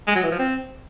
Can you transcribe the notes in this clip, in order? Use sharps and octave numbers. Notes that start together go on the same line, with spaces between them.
G#3
F#3
E3
F3
C4